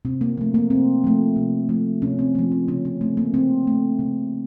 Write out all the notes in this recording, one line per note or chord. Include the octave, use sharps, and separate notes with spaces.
C3 C4
A#3
F3 A3 C4
A#3
C3 C4
F3 A3
C3
F3 A3
C3 C#4
C4
F3 A3 A#3
C4
C#3 C#4
C#4
A3 C4
A#3
C#3 C4
A3
C#3